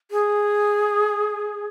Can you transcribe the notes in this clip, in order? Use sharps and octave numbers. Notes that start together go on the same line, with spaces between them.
G#4